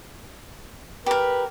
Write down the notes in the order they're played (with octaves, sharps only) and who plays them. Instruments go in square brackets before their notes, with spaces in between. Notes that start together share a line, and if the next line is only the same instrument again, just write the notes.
[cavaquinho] G4 A#4 [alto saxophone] B4